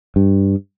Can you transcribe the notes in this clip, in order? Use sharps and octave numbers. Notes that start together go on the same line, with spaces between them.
G2